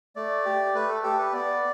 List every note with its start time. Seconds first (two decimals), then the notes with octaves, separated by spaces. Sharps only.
0.16 A3 D5
0.45 G4
0.75 A3 B4
0.89 A4
1.03 G4 A4
1.18 B4
1.33 B3 D5